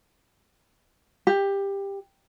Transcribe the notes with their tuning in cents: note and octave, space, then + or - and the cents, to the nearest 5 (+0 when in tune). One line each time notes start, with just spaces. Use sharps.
G4 +15